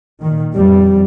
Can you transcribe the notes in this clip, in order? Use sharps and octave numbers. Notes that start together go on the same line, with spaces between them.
A#2 D#3
F2 G3